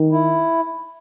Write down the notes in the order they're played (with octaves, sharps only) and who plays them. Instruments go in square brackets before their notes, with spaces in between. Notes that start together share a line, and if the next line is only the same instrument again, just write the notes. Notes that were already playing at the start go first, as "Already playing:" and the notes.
Already playing: [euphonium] D#3
[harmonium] E4